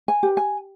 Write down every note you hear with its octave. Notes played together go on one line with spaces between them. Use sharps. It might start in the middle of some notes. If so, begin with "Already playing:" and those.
G#5
G4 B4
G#5